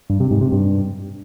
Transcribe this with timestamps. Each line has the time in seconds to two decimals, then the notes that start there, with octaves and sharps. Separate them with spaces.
0.10 G2
0.20 C3
0.31 G#2
0.41 C3
0.52 G2